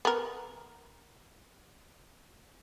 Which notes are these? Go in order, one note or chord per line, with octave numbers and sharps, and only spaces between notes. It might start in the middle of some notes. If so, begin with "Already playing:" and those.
B3 A#4